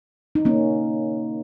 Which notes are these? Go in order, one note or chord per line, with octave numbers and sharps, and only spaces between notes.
D#4
A#3 C#4